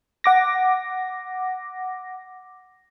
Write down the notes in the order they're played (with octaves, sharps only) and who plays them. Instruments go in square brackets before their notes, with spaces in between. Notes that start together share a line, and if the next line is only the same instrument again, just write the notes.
[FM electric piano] F#5 D6 A#6